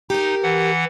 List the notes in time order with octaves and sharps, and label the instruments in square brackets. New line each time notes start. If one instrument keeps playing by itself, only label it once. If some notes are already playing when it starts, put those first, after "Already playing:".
[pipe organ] D#4 [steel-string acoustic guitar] G4 A#4
[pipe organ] E3 F#5